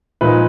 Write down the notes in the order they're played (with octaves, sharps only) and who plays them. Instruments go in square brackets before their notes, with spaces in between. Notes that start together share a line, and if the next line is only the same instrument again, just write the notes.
[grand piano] A#2 F3 G#3 D#4 B4